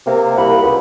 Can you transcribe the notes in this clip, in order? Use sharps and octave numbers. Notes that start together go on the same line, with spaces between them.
C3 A#3
C2 F5 F#5 B5
C#2